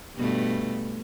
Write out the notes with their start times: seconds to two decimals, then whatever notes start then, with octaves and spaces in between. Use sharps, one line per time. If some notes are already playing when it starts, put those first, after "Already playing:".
0.15 G2 B2 A3